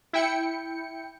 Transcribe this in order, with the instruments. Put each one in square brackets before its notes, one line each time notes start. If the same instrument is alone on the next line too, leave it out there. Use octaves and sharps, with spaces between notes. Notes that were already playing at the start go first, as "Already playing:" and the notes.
[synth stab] E4 G5 C#7